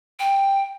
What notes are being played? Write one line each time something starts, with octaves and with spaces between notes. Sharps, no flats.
G5